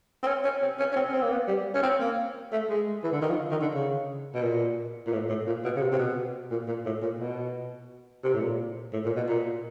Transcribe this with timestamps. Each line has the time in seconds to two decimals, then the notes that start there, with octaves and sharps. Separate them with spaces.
0.23 C4
0.27 C#4
0.44 C#4
0.62 C4
0.79 C#4
0.92 C#4
0.96 C4
1.09 C#4
1.14 C4
1.22 A#3
1.32 B3
1.48 G3
1.74 C#4
1.83 C4
2.00 A#3
2.52 A3
2.70 G#3
3.04 E3
3.12 D3
3.22 D#3
3.30 F3
3.51 D#3
3.62 D3
3.74 C#3
4.35 B2
4.42 A#2
5.07 A#2
5.13 A2
5.29 A2
5.47 A#2
5.64 B2
5.76 C#3
5.82 C3
5.92 C3
5.99 B2
6.51 A#2
6.68 A#2
6.86 A2
7.02 A#2
7.19 B2
8.24 C3
8.34 A2
8.41 A#2
8.93 A2
9.05 A#2
9.16 B2
9.28 A#2